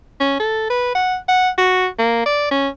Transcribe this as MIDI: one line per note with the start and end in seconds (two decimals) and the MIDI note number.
0.20 0.35 61
0.40 0.70 69
0.70 0.94 71
0.95 1.17 78
1.28 1.49 78
1.58 1.87 66
1.99 2.23 58
2.26 2.46 74
2.51 2.69 61